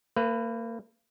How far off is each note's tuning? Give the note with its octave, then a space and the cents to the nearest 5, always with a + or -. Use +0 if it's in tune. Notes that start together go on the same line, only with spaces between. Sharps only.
A#3 -35 B4 +10